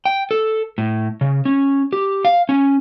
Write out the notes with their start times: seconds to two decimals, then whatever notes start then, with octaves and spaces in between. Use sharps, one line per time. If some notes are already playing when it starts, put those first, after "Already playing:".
0.06 G5
0.31 A4
0.78 A2
1.21 C#3
1.45 C#4
1.93 G4
2.25 F5
2.49 C#4